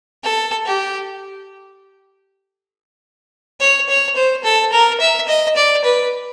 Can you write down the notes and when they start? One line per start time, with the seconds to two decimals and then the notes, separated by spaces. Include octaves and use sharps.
0.24 A4
0.66 G4
3.60 C#5
3.89 C#5
4.16 C5
4.45 A4
4.73 A#4
5.00 E5
5.28 D#5
5.56 D5
5.84 B4